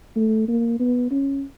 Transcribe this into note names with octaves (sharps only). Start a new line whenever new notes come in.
A3
A#3
B3
C#4